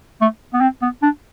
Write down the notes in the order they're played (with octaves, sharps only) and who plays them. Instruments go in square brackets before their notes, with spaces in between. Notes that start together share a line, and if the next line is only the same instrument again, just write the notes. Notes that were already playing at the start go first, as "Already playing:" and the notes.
[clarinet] A3
B3
C4
B3
D4